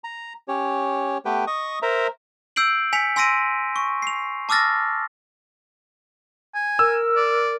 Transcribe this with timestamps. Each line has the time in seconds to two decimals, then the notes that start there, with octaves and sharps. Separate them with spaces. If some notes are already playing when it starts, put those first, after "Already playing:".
0.04 A#5
0.48 C#4 G4 C#5
1.25 A3 B3 G4 B4 G5
1.47 D#5 C#6 D#6
1.82 A#4 C5 E5 A#5
2.56 E6 G6 C7 D7 F#7
2.93 G#5 B6 C#7 F7
3.16 G#5 C6 E6 A#6 D7 D#7
3.76 C#6
4.02 C7 F7
4.49 A5 D6 E6 F6 A6 A#6
6.55 G#5
6.79 A#4 E6
7.17 D5